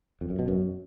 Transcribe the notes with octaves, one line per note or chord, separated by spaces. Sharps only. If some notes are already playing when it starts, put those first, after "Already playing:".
F2
F#2
B2
F#2